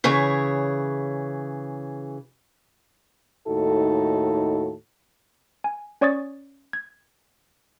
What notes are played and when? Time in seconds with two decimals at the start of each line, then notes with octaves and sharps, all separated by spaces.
0.04 C#3 E3 G#4 C#5
3.47 D#2 A2 D#4 F#4 A4
5.64 G#5
6.01 C#4 C#5 D5 C#6 D#6 A6
6.73 G#6